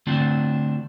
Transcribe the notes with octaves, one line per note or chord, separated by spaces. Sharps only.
D3 A3 C4 D4 F4